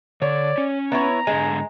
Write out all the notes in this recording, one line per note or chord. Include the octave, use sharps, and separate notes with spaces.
D3 C#5 D5
C#4
B3 E4 C#5 A#5
G#2 D3 G#3 G#5